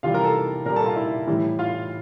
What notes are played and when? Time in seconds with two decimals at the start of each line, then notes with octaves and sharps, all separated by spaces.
0.03 C3 E3 G3 F4 F5
0.14 A#4 A#5
0.24 A4 A5
0.65 A#2 G3 A#4 A#5
0.76 A4 A5
0.86 F4 F5
0.96 E4 E5
1.27 A2 E3 G3
1.59 F4 F5